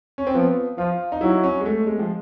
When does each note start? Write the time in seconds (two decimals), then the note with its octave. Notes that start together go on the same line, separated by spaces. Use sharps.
0.18 C#4
0.27 C4
0.35 F3 B3
0.78 F3 F4
1.12 D#4
1.21 F#3 E4
1.44 C#4
1.61 G#3
1.66 A3
1.87 G#3
1.99 F3